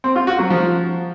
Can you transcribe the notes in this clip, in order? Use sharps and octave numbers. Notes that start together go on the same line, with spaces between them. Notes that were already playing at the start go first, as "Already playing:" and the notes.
C4
F4
F#4
F#3
F3